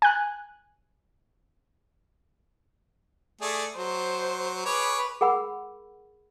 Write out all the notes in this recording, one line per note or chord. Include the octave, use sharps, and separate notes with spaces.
G#5 F#6
A3 G#4 D5
F#3 C5
G#4 B4 C#5 D6
G#4 A#4 F#5 B5 E6